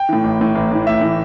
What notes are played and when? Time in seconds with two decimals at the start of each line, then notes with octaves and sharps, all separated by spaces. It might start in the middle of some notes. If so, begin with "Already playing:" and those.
Already playing: G5
0.09 A2 E3
0.24 A1
0.40 A2 E3
0.55 A1
0.71 A2 E3
0.87 A1 E5
1.01 A2 E3